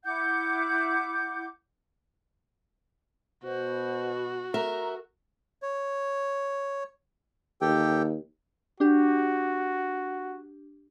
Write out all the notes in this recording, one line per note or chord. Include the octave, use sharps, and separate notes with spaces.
E4 F#5 D6 G6
B2 F#4 C5
A#4 E5 A#5
C#5
D#2 G4 A4 G5
D4 F#4 G4